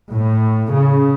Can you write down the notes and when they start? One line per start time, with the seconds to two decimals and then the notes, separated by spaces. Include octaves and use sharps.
0.11 A2
0.73 C#3